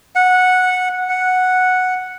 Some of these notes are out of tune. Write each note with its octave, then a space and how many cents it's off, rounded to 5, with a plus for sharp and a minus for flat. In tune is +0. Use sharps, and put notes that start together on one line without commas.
F#5 -10
F#5 -5